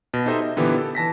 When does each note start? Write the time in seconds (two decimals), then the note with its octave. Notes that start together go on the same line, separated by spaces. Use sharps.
0.14 B2
0.26 D#4 G4 A4 C5 D#5 E5
0.41 D#5
0.56 A#2 D3 E3 B3 G4
0.78 A4
0.95 E3 A5 A#6 B6